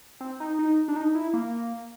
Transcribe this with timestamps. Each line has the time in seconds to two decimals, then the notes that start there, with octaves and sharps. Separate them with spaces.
0.21 C4
0.40 D#4
0.59 D#4
0.88 D4
0.96 D#4
1.15 E4
1.33 A#3